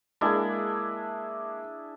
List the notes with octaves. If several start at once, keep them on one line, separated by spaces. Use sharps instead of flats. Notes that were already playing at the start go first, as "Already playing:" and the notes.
G#3 A#3 D4 E4 G#4 G#6